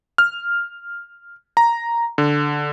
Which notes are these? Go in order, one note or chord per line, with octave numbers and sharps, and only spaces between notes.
F6
A#5
D3